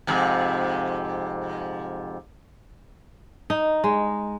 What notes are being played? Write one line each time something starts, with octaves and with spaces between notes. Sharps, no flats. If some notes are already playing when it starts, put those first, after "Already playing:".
F2 G#2 C3
D#4
G#3